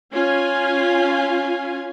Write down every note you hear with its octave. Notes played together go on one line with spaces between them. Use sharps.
C#4 F4 G#5